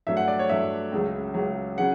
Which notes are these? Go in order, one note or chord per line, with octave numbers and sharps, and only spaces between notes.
G2 F#3 A3 E5
F#5
D5
C#5
G2 F#3 A3 E5
C#2 C#3 F#3
C#2 C#3 F#3
C#3 F#3 F#5